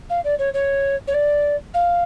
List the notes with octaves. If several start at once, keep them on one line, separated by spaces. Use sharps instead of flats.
F5
D5
C#5
C#5
C#5
D5
F5